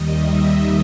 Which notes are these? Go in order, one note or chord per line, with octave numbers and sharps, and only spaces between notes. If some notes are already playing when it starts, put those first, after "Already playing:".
Already playing: D#2 D#3 G3 D#5
E5
D#5